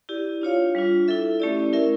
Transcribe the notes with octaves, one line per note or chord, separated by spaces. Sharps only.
E4 G4 D5
D4 F4 C#5 F5
G3 D4 F4
E4 A4 E5
A3 C#4 E4 G4 D5
C#4 E4 A#4 E5